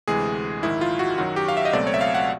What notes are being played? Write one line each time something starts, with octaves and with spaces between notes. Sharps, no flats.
D2 C3 E3 G#3 G#4
A#1 G#2 D#3 E4
F4
F#4
F#2 D#3 F#3 F#4
G4
F5
E5
D#5
C#2 B2 F#3 A3 C4 D5
C#5
E5
F5
F#5